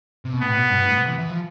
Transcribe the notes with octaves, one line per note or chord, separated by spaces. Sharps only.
C3
B2
A2 B3
B2
G2
A2
C3
E3
E3
F3